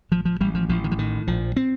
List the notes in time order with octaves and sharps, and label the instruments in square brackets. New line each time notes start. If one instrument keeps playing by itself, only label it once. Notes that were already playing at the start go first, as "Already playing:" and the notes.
[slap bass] A1 F3
F3
A1 G3
F3
A1 F3
D#3
F3
A2 D#3
A#1 F3
C4